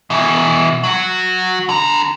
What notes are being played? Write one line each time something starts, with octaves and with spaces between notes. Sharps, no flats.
B2 E3
F#3 F#4
D3 A#5